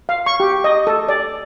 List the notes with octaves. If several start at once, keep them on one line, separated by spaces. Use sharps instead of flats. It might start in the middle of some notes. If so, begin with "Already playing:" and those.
F5
C#6
G4
D#5
A4
D5